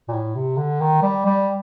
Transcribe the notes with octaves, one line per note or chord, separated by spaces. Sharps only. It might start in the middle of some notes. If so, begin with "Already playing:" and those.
A#2
A2
C3
D3
D#3
G3
G3